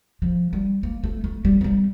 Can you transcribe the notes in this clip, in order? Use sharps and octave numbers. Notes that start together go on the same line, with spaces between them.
F3
G3
A#3
A3
A3
G3
A3
G3